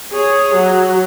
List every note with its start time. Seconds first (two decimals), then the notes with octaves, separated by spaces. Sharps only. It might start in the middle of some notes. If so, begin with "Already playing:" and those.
0.12 G#4 C#5
0.55 F#3